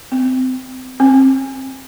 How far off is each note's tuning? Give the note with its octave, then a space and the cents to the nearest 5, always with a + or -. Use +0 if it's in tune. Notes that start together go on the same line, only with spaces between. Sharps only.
C4 -25
C4 +30